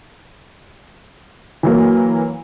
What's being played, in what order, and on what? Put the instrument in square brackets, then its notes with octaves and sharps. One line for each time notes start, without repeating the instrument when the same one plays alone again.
[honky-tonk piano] E3 F#3 A#3